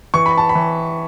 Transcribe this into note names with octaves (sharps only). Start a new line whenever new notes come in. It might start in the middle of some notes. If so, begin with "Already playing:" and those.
E3 C#6
B5
A5
B5
E3